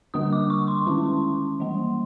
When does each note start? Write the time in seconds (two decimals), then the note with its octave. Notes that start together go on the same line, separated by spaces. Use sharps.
0.14 D3 G3 A#3 D4 D#6
0.33 D6
0.50 C#6
0.68 C6
0.87 D#3 G#3 C#4 E4
1.60 E3 G3 A#3